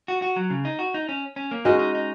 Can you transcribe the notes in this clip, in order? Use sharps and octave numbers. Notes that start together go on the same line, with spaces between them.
F#4
F#4
F#3
C#3
D#4
F#4
D#4
C#4
C#4
A#3
G#3 C#4 D#4 F#4 D#5
D#4
D#4